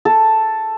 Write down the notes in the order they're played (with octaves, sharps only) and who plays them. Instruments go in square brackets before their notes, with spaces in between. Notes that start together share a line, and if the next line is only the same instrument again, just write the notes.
[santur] A4